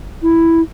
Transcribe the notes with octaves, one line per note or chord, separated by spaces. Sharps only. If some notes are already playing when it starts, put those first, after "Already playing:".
E4